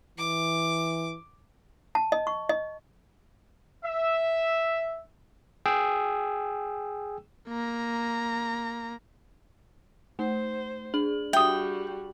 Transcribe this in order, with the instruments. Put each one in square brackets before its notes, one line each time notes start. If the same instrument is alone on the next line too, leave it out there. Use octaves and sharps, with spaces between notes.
[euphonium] E3 [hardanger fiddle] D6
[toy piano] A5
D#5
C#6
D#5
[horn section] E5
[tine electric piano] G#4 G5 E6
[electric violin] A#3 A#5
[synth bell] A3 [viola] C5
[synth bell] D4 G#4 F#7
[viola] G3 F#4 [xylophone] E5 D#6 [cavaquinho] G5